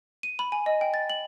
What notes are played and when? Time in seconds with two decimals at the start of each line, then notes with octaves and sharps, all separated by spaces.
0.23 D#7
0.39 B5
0.52 G#5
0.66 D#5
0.81 G5
0.94 A6
1.10 F#7